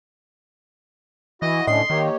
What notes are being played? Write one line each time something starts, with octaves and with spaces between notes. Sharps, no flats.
E3 E4 F#4 D#5
A2 D3 C#4 D4 D#5 C6
D#3 A#3 G4 C#5